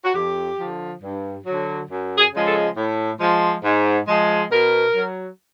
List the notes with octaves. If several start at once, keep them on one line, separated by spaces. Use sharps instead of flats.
F#4
F2 G4
D3 F3
G2
F#3
D3
F#2
G#4
C#3 F3 G#3
A4
A2
F3 G#3
G#2
F3 G#3
B2 A#4
F#3